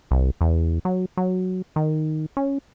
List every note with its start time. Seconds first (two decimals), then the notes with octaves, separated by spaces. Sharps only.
0.11 C2
0.41 E2
0.85 F#3
1.17 F#3
1.76 D#3
2.37 C#4